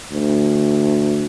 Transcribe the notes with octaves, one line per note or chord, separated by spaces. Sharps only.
D2